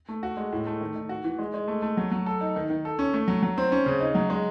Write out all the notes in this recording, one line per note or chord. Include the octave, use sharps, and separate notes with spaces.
A3
F#4
G#3
A2
A3
D#3
D#3
F#4
E3
G#3
G#3
A3
A3
F#3
F#3
A4
D#4
D#3
D#3
A4
C#4
A3
F#3
F#3
C4
C#4
C#3
D#4
F#3
G#3